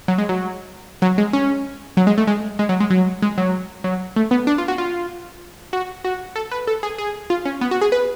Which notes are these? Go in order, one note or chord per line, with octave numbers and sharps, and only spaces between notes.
F#3
G#3
F#3
F#3
G#3
C#4
F#3
G#3
A3
G#3
G#3
F#3
G#3
F#3
G#3
F#3
F#3
A3
B3
D4
F4
F#4
F4
F#4
F#4
A4
B4
A4
G#4
G#4
F4
C#4
B3
F#4
G#4
B4